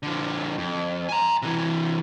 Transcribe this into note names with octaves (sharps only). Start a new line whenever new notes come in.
D3 F3
F2
G#5 A#5
C3 E3